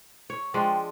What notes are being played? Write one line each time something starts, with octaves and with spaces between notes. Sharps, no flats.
C#5
F3 G#3 D4 G5